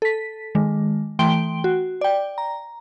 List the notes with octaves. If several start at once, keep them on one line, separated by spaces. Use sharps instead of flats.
A4 B6
D#3 G#3
E3 A3 G5 C6 D7 G7
F#4
D5 G5
A#5